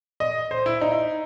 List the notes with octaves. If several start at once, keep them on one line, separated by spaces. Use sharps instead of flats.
D#5
C5
E4
D#4